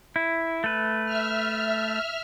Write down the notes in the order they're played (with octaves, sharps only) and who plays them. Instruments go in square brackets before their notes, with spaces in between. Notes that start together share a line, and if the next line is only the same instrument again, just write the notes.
[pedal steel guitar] E4
A3 B4
[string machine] E5 F6